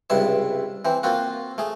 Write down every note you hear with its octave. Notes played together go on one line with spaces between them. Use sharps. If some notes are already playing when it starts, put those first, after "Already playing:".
C#2 G2 C3 E4 E5
E3 C4
A#3 C4 F4 F#4
A3 G#4